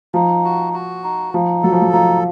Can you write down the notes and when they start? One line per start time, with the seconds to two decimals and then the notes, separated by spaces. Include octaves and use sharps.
0.14 F3 D#4
0.44 F#4
0.73 F#4
1.04 D#4
1.34 F3 D#4
1.63 F#3 A4
1.72 F3
1.82 F#3
1.93 F3 D#4